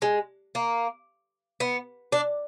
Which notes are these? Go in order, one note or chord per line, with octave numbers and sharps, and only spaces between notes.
G#3
A#3
B3
D4